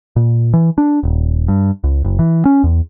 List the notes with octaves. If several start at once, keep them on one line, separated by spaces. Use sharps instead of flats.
A#2
E3
D4
D#1
G2
C#2
F#1
E3
C#4
E2